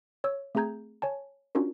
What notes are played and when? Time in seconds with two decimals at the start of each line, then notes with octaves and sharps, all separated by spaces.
0.24 C#5 E6
0.55 A3 C4 G#4 A#5 G6 G#6
1.02 C#5 G#5 A5
1.55 C#4 D4 F4 F#4 A#4